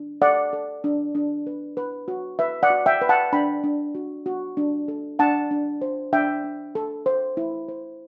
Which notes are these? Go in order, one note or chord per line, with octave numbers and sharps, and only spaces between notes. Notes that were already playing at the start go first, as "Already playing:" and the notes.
Already playing: D4
A4 D5 F#5
A4
D4
D4
B4
B4
F#4
B4 E5
D5 F#5
F#4
E5 G5
B4
F#5 A5
D4 G5 B5
D4
F#4
F#4
D4
A4
D4 F#5 A5
D4
C5
D4 E5 G5
D4
A4
C5
E4
C5